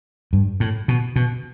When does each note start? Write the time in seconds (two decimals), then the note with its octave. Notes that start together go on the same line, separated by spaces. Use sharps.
0.33 G2
0.60 A2
0.88 B2
1.16 B2